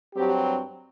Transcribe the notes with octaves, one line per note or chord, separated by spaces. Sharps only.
G2 F#3 C4 G4